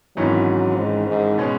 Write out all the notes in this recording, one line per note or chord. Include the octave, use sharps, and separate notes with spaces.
G#1 G#2 E3 F#3 C#4
G#2
G#2
B2 G#3 C#4